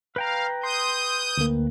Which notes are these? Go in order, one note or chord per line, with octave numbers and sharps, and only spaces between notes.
B4 F5 G5 A#5
C6 D#6 G6
D2 A#3